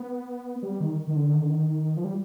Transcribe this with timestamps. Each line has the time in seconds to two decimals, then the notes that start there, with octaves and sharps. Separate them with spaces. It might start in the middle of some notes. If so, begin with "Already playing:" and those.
Already playing: B3
0.63 G3
0.81 D#3
1.08 D#3
1.16 D3
1.34 D#3
1.43 D3
1.50 D#3
1.97 F3
2.04 G3